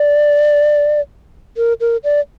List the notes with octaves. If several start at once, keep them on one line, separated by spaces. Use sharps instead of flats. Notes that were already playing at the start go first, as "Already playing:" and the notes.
Already playing: D5
A#4
A#4
D5